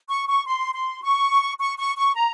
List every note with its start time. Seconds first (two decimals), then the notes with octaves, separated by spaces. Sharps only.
0.08 C#6
0.28 C#6
0.46 C6
0.75 C6
1.02 C#6
1.60 C#6
1.78 C#6
1.97 C#6
2.15 A#5